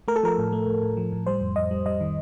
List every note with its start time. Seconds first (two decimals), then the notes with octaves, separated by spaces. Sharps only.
0.08 A3 A#4
0.16 A4
0.23 F3 A#4
0.38 A2
0.52 A3
0.67 A2
0.83 A2
0.97 F3
1.12 A2
1.27 G3 C5
1.41 F2
1.56 F2 D#5
1.71 G3
1.86 G3 D#5
2.01 D#3